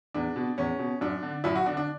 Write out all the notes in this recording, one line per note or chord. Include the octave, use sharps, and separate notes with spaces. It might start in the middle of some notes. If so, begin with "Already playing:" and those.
E2 D4
B2
E2 C#4
B2
F#2 D4
D3
F#2 E4
F#4
D3 D4
D4